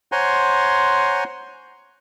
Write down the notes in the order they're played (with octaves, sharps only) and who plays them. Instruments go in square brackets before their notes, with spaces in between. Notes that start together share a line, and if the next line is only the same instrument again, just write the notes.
[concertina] C5 C#5 F#5 G#5 A#5 C6